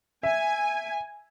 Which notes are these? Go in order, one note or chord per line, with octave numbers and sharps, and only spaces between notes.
E5 G#5